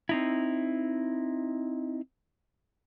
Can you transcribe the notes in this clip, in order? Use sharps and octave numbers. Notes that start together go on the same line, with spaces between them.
C4 D#4 E4